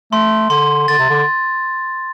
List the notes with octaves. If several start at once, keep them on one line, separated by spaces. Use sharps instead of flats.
A3 C6
D3 C6
D3 A6
C3
D3